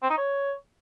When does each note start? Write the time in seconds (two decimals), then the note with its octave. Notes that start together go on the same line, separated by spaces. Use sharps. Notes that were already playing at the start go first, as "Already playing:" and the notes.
0.02 C4
0.10 D#4
0.17 C#5